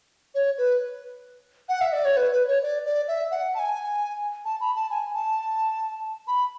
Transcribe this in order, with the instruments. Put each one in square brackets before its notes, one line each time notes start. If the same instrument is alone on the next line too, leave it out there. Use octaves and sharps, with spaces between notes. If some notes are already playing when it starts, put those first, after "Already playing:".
[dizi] C#5
B4
F#5
E5
D5
C#5
B4
B4
C#5
D5
D5
E5
F#5
A5
G#5
A5
B5
A5
G#5
A5
B5